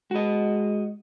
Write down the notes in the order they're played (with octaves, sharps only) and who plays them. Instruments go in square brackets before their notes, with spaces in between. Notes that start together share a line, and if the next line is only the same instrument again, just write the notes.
[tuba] G#3 [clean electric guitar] F#4 D#5